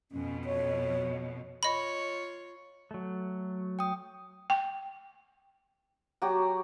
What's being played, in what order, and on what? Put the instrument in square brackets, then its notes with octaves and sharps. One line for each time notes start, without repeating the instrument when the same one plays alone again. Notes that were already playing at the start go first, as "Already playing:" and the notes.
[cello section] F2 B2 [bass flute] C#4
[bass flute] C#5
[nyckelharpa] F4 C#5 [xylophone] D#5 B5
[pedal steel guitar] F#3 A3
[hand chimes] G5 D#6
[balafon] G5
[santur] F#3 F#4 G4